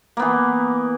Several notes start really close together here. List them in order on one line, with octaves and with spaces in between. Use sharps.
A#3 B3 E3